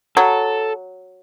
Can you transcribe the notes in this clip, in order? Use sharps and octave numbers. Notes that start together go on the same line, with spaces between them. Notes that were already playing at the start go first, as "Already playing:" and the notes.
F#3 A4